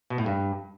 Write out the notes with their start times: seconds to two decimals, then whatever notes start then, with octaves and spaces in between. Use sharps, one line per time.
0.10 B2
0.18 A2
0.26 G2